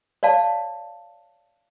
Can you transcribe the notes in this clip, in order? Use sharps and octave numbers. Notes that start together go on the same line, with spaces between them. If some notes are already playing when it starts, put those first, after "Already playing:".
C#5 D5 F5 A5